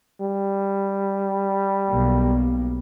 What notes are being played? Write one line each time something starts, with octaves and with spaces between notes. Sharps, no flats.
G3
B1 B2 A#3